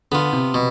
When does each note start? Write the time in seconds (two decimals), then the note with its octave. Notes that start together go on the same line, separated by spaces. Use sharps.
0.12 D3 B3 F4
0.33 C3
0.54 B2